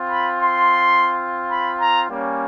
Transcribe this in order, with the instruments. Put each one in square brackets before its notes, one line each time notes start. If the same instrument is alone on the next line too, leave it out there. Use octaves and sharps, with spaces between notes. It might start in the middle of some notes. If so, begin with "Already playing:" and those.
Already playing: [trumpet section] C4 F4
B5
C6
B5
A#5
G3 A#3 C#4